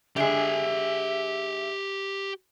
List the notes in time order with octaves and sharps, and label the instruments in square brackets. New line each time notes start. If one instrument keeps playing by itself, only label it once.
[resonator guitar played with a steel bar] D3 G#3 [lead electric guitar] G4 G#5 [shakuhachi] E5